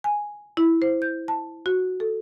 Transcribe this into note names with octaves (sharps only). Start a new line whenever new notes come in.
G#5
E4
C5
G6
A5
F#4
A4